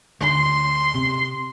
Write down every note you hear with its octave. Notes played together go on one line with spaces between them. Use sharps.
D2 D3 C6
C3